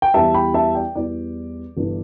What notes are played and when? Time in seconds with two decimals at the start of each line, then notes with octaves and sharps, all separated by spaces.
0.02 G5
0.14 E2 E3 G3 E5 A5
0.34 G5 B5
0.54 E5 A5
0.75 D5 G5
0.95 E2 E3 G3 D5
1.77 G1 G2 E3